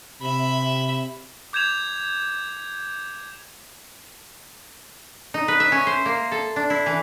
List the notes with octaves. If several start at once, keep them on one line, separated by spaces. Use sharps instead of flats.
C3 E5 B5
D6 G6 G#6 E7 F7
D#4
B4
E5
C#4
C5
A#3
A4
D4
E4
E3